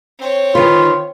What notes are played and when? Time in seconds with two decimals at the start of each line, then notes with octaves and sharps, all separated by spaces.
0.19 C4 C#5
0.55 D#3 F4 B4